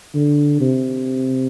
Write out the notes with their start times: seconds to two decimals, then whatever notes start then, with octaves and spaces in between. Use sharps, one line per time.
0.14 D3
0.60 C3